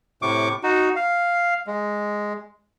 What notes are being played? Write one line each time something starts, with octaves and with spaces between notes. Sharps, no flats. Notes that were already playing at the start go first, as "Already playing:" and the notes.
A2 C3 C#6 D6
D#4 F#4
F5
G#3